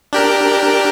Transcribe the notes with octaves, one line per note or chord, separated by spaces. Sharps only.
D4 G4 A#4